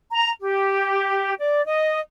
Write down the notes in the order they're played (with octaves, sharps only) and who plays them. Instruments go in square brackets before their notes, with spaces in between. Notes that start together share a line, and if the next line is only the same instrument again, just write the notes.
[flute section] A#5
G4
D5
D#5